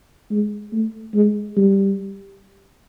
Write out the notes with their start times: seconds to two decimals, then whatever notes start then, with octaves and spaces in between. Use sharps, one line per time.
0.31 G#3
0.73 A3
1.14 G#3
1.57 G3